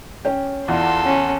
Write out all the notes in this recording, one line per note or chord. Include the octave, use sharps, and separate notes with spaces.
C#4 G5
E2 E4 F4 A4 D5 C6
C#4